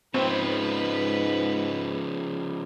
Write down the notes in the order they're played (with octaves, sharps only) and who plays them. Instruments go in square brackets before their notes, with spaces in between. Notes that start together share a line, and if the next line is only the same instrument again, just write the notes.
[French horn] G#2 [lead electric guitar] C#3 F3 [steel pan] C4 [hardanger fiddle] B4